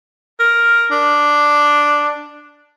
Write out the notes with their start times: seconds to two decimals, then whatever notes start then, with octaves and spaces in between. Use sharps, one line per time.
0.40 A#4
0.91 D4